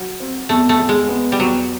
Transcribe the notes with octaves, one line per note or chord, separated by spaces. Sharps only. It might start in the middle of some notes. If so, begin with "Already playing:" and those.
Already playing: F#3
C4
E2 A3
A3
E2
G#3
B3
G3
E2 F#3